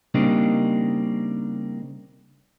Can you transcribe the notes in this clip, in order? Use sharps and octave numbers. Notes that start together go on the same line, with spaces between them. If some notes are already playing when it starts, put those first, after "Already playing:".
C#3 G3 A#3 C4 D4 D#4